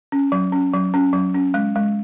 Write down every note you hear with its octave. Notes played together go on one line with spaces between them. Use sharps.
C#4
F#3
C#4
F#3
C#4
F#3
C#4
G#3
G#3